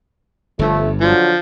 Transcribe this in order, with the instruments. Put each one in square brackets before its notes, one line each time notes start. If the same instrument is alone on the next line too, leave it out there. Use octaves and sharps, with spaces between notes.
[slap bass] G1 G2 [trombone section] F3 A3
[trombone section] D3 F#3 [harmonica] F3